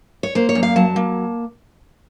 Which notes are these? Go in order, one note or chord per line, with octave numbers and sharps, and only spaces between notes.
C#5
A#3 C5
C#5
F#2
F5
F#3 A5
A#3